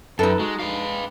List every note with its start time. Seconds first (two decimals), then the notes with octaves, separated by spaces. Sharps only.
0.19 F#2 D#4 A4 B4
0.39 G#3 F#4
0.59 G#3 B4 F5